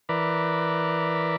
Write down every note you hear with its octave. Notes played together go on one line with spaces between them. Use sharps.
E3 A#4 B4 D5